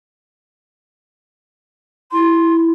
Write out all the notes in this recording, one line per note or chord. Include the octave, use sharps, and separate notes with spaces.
E4 C6